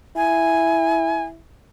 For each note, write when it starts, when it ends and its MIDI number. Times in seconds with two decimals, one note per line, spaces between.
0.16 1.39 64
0.16 1.24 80